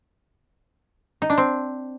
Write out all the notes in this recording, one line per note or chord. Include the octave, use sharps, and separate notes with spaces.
D#4
D4
C4